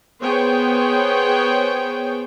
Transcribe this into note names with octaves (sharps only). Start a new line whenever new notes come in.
B3 G#4 C5 C#5 G5